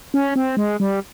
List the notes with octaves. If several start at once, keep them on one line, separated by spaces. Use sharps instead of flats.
C#4
C4
G#3
G3